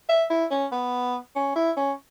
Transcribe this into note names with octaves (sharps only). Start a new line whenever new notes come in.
E5
E4
C#4
B3
C#4
E4
C#4